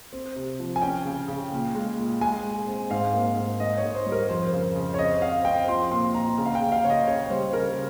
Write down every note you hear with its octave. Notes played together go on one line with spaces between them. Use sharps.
C4
C3
F3
G#5
C#4 G5
C#3
C#3
A#2
G#3
A#2
G#3 G#5
G#3
C4
G#2 F5
A#3
G#2
G#2 D#5
C#5
G#2
C5
G3
A#4
F2 C5
C#3
C#3
C#5
C4 D#5
C4 F5
C4 G5
F3 C6
A#2 C6
A#2 A#5
C#3
F5
G5
C#3
F5
C#3 C#5
D#5
C#3 C#5
G3 C5
C#3 A#4